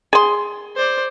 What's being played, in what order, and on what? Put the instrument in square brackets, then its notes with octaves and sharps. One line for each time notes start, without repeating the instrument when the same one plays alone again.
[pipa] G#4 C6
[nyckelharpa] C5 D5